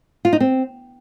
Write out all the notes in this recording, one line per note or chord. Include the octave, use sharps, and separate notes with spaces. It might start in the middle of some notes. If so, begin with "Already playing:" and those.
F4
D#4
C4